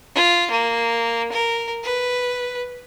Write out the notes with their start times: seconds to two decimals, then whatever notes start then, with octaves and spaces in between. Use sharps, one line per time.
0.15 F4
0.51 A#3
1.32 A#4
1.83 B4